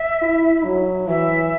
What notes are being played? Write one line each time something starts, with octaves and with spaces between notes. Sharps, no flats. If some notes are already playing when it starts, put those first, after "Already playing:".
Already playing: E5
E4
F#3
E3 E5